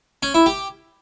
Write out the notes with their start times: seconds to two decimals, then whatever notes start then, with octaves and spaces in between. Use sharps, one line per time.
0.23 C#4
0.34 E4
0.46 G4